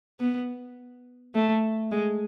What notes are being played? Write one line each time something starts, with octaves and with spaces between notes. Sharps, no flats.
B3
A3
G#3